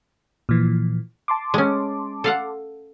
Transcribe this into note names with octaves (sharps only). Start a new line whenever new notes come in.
A#2 E3 F3
A5 C6 D6
G#3 C#4
A4 F5 F#5